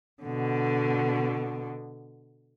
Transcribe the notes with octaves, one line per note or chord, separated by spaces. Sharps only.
B2 D3